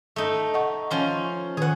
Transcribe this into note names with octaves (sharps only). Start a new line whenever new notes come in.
A3 D#4
D#5 F#5 C#6
F3 C#4 C6
D#3 G#4 B4 F#5